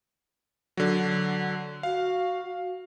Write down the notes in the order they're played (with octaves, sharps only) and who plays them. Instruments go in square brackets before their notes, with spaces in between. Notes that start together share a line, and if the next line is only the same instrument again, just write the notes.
[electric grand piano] D3 F#3
[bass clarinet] F#4 [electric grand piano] F5